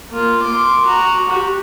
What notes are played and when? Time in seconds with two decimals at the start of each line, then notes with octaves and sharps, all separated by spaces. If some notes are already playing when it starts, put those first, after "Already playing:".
0.11 A#3 F4
0.43 C6 D6
0.86 F#4 A#5
1.29 F#4 G4